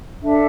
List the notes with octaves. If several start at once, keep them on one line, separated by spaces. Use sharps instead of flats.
D4 A4 E5